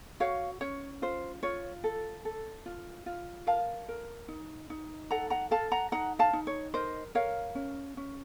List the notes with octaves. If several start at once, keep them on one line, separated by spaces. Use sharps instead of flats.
F#4 C#5 F5
C#4 C#5
F4 C5
F4 C#5
A4
A4
F4
F4
A#4 F5 A5
A#4
D#4
D#4
A4 F#5 A#5
F#5 A#5
A4 F5 A5
F#5 A#5
D#4 F#5 A#5
F5 A5
D#4
C#5
A#4 C5 D#5
A#4 C#5 F5
C#4
C#4